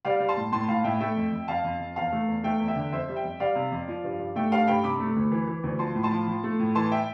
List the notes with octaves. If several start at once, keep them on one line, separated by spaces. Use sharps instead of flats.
G3 D5 F5
G3
A5 C6
A2
A2 A5 C6
A2 F5 A5
A2 E5 G5
A3 E5 G5
F2
F2
F2 F5 A5
F2
F2
E2 F5 A5
A3
E2
A3 E5 G5
E2
E5 G5
D3
F2 C5 E5
G3
E5 G5
F2
G3 D5 F5
C3
F2
F3
G2
G2
A3 E5 G5
G2 F5 A5
G2 G5 B5
C3 B5 D6
A3
D2
E3
E3
D2
F3 A5 C6
A2
A5 C6
F3
F3
A3
A2
E3 A5 C6
E5 G5